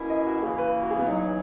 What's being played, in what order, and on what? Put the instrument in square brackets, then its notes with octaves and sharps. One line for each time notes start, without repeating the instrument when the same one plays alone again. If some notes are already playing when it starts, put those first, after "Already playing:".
Already playing: [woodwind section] B2 A#3 C#4 E4
[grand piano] D#5
F#4
[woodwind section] C#3 E3 A#3 [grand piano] G#4
[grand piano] B4
F#4
G#4
B3
[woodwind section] E2 C#3 F#3 [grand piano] D#4